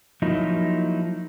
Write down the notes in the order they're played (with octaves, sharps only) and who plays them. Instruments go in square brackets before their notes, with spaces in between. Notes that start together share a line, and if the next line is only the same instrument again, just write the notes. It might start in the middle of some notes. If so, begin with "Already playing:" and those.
[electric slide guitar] F3 F#3 A#3 D#4 E4